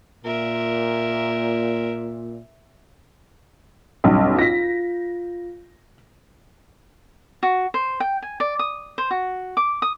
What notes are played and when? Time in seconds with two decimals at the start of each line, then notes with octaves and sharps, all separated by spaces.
0.25 A#2 A#4 E5
4.04 B1 E2 G2 C#4
4.39 F4 A#6 B6
7.43 F#4
7.74 C5
8.00 G5
8.22 G#5
8.40 D5
8.59 D#6
8.98 C5
9.11 F#4
9.57 D6
9.82 D#6